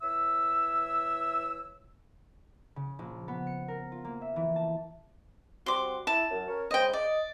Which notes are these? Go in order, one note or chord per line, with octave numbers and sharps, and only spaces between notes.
E3 C#5 E5 E6
C#3
A#1
B3
C#7
A#4
F4
A#3
E5
E3
A5
G3 C4 F#4 C6 D6
E4 A5
F#2
C#4 A#4 C#5
C#3 G#3 C5 D#5 G5
D5 D#5